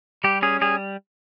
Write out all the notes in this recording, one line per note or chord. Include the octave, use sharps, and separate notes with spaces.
G3 G4
C#4 G#4
G3 G#4